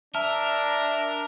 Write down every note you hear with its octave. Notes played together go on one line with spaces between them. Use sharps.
D4 A#4 E5 A5 F6